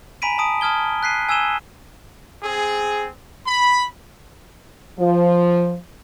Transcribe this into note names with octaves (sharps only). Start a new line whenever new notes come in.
G#5 A#5 B5 B6 D7 D#7
A5 D#6 D7
A5 D#6 F6 G#6 G7
F#6 B6 C7 D#7
G#5 E6 G#6 D#7 E7 G7
C4 G#4
B5
F3